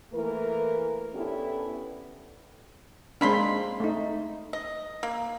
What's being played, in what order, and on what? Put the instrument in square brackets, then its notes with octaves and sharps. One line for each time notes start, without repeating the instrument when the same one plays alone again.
[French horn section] E3 A3 A#3 E4 A#4
B3 C#4 D4 E4 G4 A4
[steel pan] G#3 C4 D4 [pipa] A#3 B5 C6
[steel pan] A3 D#4
[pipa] D#5
A#3